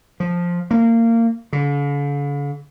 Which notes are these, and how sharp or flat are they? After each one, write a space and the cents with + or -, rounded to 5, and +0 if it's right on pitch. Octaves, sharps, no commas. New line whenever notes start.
F3 +5
A#3 -25
D3 -45